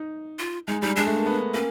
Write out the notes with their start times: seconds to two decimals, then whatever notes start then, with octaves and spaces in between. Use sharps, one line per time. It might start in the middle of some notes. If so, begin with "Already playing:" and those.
Already playing: D#4
0.39 F4
0.67 G#3 D#4
0.82 G3 D#4
0.96 G#3 D4
1.06 A3
1.16 A#3
1.26 B3
1.54 A#3 C#4